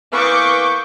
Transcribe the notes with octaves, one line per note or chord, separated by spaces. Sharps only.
E3 A#3 B3 C#6 D6 G6